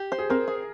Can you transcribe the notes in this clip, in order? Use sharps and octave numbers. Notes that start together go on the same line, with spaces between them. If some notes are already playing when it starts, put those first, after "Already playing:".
Already playing: G4
C5
G#4
C4 A#4
G#4